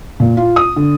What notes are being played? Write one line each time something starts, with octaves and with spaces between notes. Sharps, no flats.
A#2
F4
D#6
D3